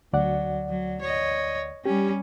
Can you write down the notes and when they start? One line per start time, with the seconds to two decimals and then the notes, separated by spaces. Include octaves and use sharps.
0.13 D2 F#3 D5 F#5
0.69 F#3
1.01 C#5 D#5
1.85 G3 C#4 G4